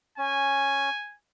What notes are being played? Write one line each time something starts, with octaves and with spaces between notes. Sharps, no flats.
C#4 G#5